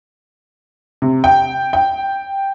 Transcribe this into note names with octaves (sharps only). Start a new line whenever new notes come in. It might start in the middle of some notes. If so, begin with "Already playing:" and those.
C3
G5
G5